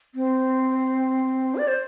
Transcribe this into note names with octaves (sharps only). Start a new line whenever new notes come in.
C4
D5
C5